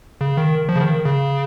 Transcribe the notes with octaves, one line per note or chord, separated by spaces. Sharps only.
C#3
D#3
F3
C#3
D#3
C#3